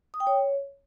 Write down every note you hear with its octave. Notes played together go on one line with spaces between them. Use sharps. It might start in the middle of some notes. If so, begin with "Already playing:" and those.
D#6
G5
C#5